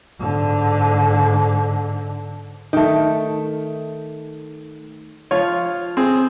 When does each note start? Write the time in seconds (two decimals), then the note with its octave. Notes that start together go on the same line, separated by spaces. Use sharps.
0.20 G#2 D3
2.73 D#3 A3
5.31 F3 F4 C#5
5.97 C4 G#4